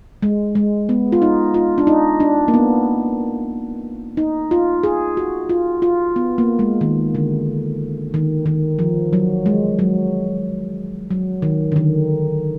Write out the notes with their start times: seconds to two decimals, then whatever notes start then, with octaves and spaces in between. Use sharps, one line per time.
0.22 G#3
0.55 G#3
0.89 B3
1.12 F4
1.22 D#4
1.54 F4
1.78 D4
1.87 D#4
2.20 D4
2.48 A#3
2.54 B3
4.17 D#4
4.51 F4
4.83 G#4
5.17 F#4
5.49 F4
5.82 F4
6.16 B3
6.38 A#3
6.59 G#3
6.81 D#3
7.15 D3
8.14 D#3
8.46 D#3
8.79 F3
9.13 F#3
9.46 G#3
9.79 F#3
11.11 F#3
11.42 D#3
11.72 D3
11.76 D#3